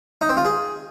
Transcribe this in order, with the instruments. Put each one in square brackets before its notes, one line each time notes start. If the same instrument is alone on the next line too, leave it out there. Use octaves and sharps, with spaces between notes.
[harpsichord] D#4
C4
F4
G#4